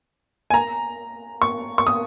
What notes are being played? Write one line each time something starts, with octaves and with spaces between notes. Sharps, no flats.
G#5
A#5
C#6
C#6
D#6